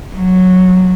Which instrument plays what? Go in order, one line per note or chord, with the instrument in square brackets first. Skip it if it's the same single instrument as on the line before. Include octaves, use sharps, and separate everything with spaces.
[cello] F#3